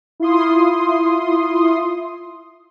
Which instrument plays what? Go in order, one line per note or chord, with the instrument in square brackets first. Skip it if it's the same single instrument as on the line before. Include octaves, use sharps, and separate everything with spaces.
[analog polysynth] E4 F4 C6 D#6